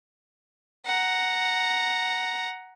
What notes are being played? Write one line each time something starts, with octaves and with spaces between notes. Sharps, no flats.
F#5 A#5